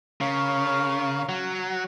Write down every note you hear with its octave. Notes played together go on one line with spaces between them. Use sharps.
C#3 A#4 C#5 F5
F#3